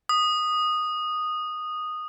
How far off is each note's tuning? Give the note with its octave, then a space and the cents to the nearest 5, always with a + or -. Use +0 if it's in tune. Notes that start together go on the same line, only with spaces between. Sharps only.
D#6 -10